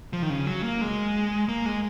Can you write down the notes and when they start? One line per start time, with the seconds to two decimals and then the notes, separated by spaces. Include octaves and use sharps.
0.13 F3
0.22 D#3
0.30 C#3
0.46 F#3
0.63 A#3
0.81 G#3
1.49 A#3
1.66 G#3